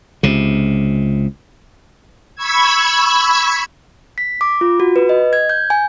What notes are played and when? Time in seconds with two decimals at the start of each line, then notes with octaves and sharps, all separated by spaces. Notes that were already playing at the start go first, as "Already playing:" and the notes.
0.23 C#2 C3
2.36 B5 C#6 E6 G#6
4.18 B6
4.41 D6
4.61 F4
4.80 F#4
4.96 B4
5.09 D#5
5.33 G#6
5.49 G6
5.70 G#5